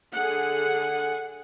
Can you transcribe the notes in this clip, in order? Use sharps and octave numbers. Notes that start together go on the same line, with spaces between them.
D3 G#4 F#5